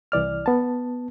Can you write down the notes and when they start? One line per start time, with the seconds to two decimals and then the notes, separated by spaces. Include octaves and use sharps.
0.12 C2 E3 D5 F6
0.46 B3 A5